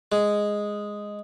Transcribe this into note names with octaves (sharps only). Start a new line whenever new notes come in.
G#3